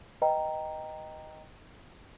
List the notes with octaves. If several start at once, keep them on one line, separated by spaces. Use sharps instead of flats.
B4 D#5 G5 A#5